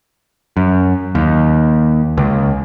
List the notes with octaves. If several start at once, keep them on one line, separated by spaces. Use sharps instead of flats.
F#2
D#2
C#2